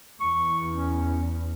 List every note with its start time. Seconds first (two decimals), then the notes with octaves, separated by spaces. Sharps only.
0.20 E2 C#6
0.70 C#4